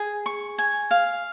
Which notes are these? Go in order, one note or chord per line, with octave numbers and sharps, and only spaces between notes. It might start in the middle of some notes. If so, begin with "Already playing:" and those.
Already playing: G#4
C#6
G#5
F5